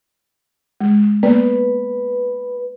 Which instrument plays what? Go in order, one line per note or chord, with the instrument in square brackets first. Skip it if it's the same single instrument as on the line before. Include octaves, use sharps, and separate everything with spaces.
[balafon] G#3
[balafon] A#3 B3 D5 [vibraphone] B4